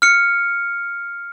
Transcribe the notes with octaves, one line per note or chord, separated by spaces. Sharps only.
F6 C#7